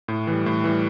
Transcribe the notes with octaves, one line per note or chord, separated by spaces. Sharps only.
A2
E3 G3
A2
E3 G3